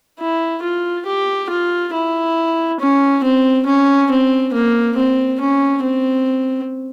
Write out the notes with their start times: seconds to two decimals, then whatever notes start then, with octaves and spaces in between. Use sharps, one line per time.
0.19 E4
0.62 F4
1.06 G4
1.50 F4
1.93 E4
2.80 C#4
3.24 C4
3.66 C#4
4.11 C4
4.53 A#3
4.97 C4
5.41 C#4
5.83 C4